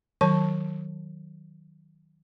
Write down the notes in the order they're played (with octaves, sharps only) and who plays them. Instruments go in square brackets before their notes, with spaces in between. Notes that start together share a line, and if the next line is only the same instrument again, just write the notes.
[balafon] D#3 F#3 C#5 A5